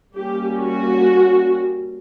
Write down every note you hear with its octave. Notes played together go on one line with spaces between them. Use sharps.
G3 A#3 C#4 G4
F#4